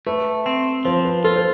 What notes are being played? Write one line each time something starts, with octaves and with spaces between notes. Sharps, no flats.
A3 B4
C4
F3 C5
B4
F4 A4
C5